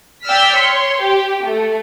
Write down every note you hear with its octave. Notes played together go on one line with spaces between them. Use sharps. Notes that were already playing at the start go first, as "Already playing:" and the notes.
D5 G5 E6 F6 B6
C#5 C6
G4
A3